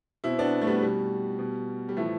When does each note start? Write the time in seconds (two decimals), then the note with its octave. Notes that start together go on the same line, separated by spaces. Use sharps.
0.24 B2 C4 E4
0.39 B3 D4
0.61 A3
0.67 G3 B3
0.82 B2 G3
1.39 B2
1.89 G3
1.97 A2 E3 F3 A3